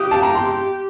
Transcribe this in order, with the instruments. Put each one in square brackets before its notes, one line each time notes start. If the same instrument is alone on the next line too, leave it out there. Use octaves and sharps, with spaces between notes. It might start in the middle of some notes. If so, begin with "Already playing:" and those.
Already playing: [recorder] G4 [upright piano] D#6 F#6
[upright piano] A5
A#5
C6